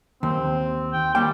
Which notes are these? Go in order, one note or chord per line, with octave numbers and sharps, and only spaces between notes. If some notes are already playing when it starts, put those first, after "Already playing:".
D#2 C4
G5
D#2 G3 A#3 G5